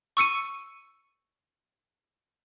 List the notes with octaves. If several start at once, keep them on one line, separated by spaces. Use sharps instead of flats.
C#6 E6 C#7 D#7